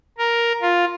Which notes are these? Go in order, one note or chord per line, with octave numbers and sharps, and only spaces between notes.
A#4
F4